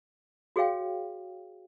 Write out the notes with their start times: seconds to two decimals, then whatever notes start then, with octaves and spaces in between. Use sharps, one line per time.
0.56 F#4 G#4 C#5 F5 G5